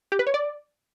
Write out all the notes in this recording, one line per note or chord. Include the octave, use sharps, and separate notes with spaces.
G4
B4
C#5
D5